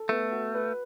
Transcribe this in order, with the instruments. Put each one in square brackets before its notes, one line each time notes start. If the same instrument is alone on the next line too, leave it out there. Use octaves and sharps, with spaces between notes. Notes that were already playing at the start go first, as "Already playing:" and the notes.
Already playing: [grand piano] A4
[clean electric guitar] A3 [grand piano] B3
[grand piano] F#4
B4